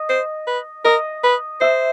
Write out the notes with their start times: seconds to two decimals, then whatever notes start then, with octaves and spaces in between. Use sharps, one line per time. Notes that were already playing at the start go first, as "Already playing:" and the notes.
Already playing: D#5
0.09 C5
0.47 B4
0.85 A#4 D#5
1.24 B4
1.61 C5 E5